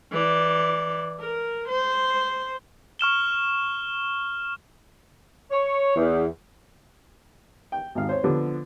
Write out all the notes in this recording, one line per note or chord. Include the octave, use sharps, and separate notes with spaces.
E3 D5
A#4
C5
C#6 F6 E7 G7
C#5
E2
G5
G#1 D#3 F5
C5 C#5
D3 F3 B3